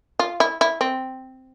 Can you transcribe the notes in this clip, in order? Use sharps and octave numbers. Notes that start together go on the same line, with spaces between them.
F4
E4
E4
C4